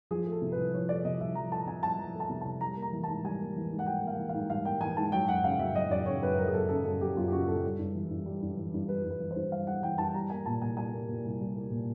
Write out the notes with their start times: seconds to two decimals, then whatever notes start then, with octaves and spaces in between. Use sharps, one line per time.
0.11 F3 G#4
0.26 A3
0.32 A4
0.42 C3
0.52 C2 B4
0.73 F3 C#5
0.89 A3 D5
1.05 C3 D#5
1.21 C2 E5
1.35 F3 A#5
1.51 A3 A5
1.67 C3 G#5
1.83 C2 A5
1.98 F3 A#5
2.15 A3
2.20 A5
2.30 C3
2.41 C2 A5
2.61 G3 A#5
2.76 A#3
2.82 A#5
2.92 E3
3.03 G#2 A5
3.24 G3 G#5
3.40 A#3
3.56 E3
3.72 G#2
3.79 F#5
3.86 G3 G5
4.02 A#3 F5
4.18 E3
4.29 G#2 F5
4.50 G3 F5
4.65 A#3 G5
4.81 E3 G#5
4.96 G#2 A5
5.12 F#3 G5
5.28 F#2 F#5
5.44 C#3 F5
5.59 F#2 E5
5.75 F#3 D#5
5.90 F#2 D5
6.06 C#3 C#5
6.23 F#2 B4
6.38 F#3 A#4
6.48 G#4
6.54 F#2 A4
6.69 C#3 A4
6.84 F#2 A4
7.01 F#3 G4
7.16 F#2 F4
7.28 G4
7.32 C#3 F#4
7.47 F#2 A4
7.64 G3
7.79 G2
7.95 E3
8.10 G2
8.26 G3
8.42 G2
8.57 E3
8.74 G2
8.88 G3 B4
9.04 G2
9.10 B4
9.20 E3
9.31 C5
9.36 G2
9.52 G3 F5
9.67 G2 F#5
9.83 E3 G5
9.98 G2 A5
10.14 G3 A#5
10.30 A#3 G#5
10.46 A#2 A5
10.62 C2 G#5
10.77 G3 G#5
10.93 A#3
11.09 A#2
11.25 C2
11.41 G3
11.56 A#3
11.71 A#2